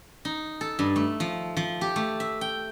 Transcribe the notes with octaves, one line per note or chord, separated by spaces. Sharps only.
D#4
A4
G2
A3
F3
F3
G4
A3
E5
G5